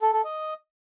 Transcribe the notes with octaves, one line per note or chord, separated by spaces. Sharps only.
A4
A4
D#5